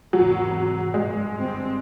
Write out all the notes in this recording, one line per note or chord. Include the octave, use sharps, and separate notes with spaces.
G#1 E2 C3 F#3
G2 G#3
G1 G3 C4